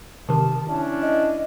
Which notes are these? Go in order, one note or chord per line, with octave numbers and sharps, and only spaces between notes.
C3 D#3 A5
C#4 D4 E4
D#5